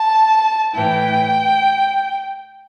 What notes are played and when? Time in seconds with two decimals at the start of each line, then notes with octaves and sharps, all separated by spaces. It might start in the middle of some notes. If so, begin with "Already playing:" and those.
Already playing: A5
0.75 A2 E3 G5